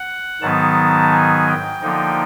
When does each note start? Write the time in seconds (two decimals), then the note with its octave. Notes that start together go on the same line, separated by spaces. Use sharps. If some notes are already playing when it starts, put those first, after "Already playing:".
Already playing: F#5
0.41 G#2 D#3 F#3 B3 D#4 A5
1.12 G#5
1.48 G5
1.81 D3 F3 A#3 D#4